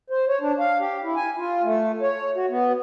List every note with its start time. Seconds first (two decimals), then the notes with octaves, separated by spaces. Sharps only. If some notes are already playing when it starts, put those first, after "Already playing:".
0.10 C5
0.28 C#5
0.41 D4
0.59 F5
0.80 G4
1.03 E4
1.16 G#5
1.37 F4
1.63 A3
2.02 C#5
2.35 F#4
2.49 B3